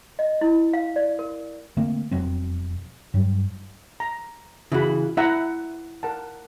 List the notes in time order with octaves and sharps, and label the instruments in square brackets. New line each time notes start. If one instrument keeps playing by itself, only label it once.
[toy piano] D#5
E4
F5
D5
A#4
[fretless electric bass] D3 A3 A#3 C4
E1 F2 F#3 C4
G2 F#3 G3
[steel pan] A#5
[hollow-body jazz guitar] C#3 E3 F#4 [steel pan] E4 B5
[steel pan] E4 F#5 A#5 [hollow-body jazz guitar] E5
[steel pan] A#4 F#5 A5